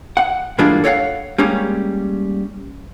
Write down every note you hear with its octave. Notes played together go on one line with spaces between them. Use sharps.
F#5
G2 E3 G#3 A#3 D4 F4
A4 C#5 D5 F5 F#5
G3 G#3 A#3 C#4